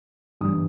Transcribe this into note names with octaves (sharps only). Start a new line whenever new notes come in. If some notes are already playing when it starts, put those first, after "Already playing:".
G2 E3 G3 D#6